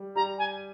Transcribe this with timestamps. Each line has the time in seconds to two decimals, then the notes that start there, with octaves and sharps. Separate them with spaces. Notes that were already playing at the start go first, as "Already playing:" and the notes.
Already playing: G3
0.15 G3 A#5
0.38 G#5